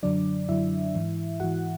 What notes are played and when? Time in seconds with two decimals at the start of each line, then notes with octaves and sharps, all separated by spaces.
0.03 F#2 D3 F#3 D4 D5
0.49 F#2 D3 F#3 E4 E5
0.95 G#2 E3
1.40 G#2 E3 F#4 F#5